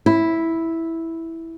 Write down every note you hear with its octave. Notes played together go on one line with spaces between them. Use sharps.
E4